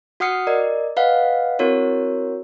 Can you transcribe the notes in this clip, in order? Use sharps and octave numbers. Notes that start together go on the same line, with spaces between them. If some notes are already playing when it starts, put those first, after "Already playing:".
F#4 F#5 D#6 F6 C7 C#7
A#4 D5 D#5
B4 D#5 F5 F#5
C4 E4 F#4 A#4 C#5